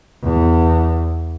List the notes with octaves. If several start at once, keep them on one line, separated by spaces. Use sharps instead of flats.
E2